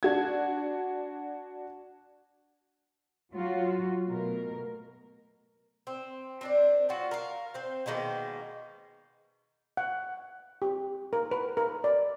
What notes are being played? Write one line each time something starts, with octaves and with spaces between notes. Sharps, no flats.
D4 F#4 G#6
F#3 F4 F#4
B2 A3 A#4
C4
C4 D4 D5
F#3 G3 F4 F#4
A#4 F5
C4 C5
B2 D#3 G#3 A#3
F#5
G4
A#4
B4
A#4
D5